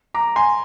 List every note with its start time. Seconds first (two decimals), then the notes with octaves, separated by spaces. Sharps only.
0.14 A#5 D6
0.36 G#5 C6